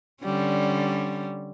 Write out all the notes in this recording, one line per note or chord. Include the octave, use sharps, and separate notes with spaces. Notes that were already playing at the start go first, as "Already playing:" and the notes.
D3 G3 C#4